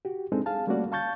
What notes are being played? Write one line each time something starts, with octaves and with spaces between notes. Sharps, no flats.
F#4 G4
G#3 C4 D4 D#4 A4
G#4 F5 A5
G3 A3 A#3 C#4 F#4 D5
F5 A5 C#6 G6 A6